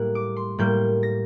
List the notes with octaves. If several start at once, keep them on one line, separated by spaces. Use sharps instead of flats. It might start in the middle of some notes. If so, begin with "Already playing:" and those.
Already playing: A2 G3 A#3 F#6
D6
C6
A2 G3 A#3 G6
A#6